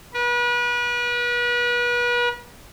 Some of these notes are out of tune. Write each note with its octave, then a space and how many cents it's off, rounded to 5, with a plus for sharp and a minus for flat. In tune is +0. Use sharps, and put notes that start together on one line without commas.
B4 -35